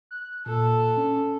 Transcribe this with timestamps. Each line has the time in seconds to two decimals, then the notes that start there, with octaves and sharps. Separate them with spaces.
0.11 F#6
0.46 A#2 A4
0.97 C#4